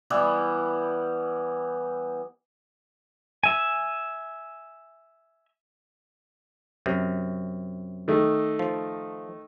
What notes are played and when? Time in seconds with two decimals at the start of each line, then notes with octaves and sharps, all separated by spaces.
0.10 E3 G3 B3 E4
3.44 E5 G#5
6.86 F#2 C3
8.08 D#3 A3
8.59 F3